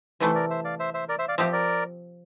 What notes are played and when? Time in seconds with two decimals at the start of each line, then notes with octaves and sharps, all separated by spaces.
0.20 C3 E3 A3 A4 C5
0.35 A#4 D5
0.50 C5 E5
0.64 D5 F5
0.80 C5 E5
0.94 C5 E5
1.09 A#4 D5
1.19 C5 E5
1.28 D5 F5
1.38 F3 C4 G4 C5 E5
1.53 A#4 D5